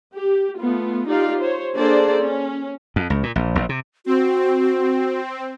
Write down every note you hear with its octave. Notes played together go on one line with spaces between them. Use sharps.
G4
A3 B3 F4
D#4 F4 G4 D5 F5
C5 C#5
A#3 D4 G#4 A4 C5 D5
C#4
F2
C#2
A#2
A#1
A#1
C3
C4 F#4